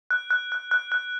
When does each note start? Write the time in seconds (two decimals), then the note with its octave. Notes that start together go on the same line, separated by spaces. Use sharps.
0.11 F#6
0.31 F#6
0.52 F#6
0.71 F#6
0.92 F#6